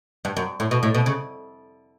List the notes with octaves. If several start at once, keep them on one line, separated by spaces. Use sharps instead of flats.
G2
F#2
A2
B2
A2
B2
C#3